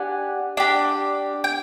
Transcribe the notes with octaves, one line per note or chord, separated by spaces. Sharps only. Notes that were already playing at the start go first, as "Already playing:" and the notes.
Already playing: D4 G4 F#5 G#5
D4 G4
G5